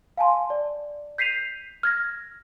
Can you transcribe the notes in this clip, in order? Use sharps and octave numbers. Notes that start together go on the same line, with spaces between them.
F5 G#5 A5 C6
D5
G6 B6 C7 D#7 F7
F6 G#6 A#6